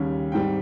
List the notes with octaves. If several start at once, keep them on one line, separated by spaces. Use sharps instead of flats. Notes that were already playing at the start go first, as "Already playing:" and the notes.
Already playing: D#2 C#3 G3 C#4
G#2 G3 C4 G5